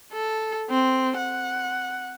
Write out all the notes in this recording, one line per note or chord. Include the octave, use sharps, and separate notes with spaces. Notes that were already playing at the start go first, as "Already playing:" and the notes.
A4
C4
F#5